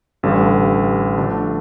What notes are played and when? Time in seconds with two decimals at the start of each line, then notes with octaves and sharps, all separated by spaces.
0.23 A1 G2 D3 G3
1.18 D3 F3 A3 D4